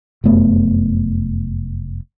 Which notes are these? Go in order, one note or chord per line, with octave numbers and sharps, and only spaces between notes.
F1 F#2 A3 B3